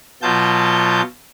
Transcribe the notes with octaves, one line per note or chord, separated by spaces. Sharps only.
B2 F#3 F4 A5 G6